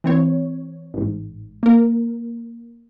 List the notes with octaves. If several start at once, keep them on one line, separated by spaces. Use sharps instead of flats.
E3 C4 C#5
A1 G#2
A#3 A#4